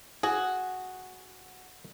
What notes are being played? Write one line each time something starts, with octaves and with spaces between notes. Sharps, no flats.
F#4 G#4